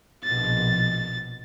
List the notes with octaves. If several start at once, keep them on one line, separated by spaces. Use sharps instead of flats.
A#1 B2 A6